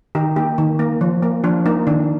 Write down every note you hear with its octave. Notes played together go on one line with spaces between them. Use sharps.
D#3 D#4 G4
A#3 D#4 G4
D#3
A#3
F3
A#3
F3 D4 F4
A#3 D#4
D#3 D4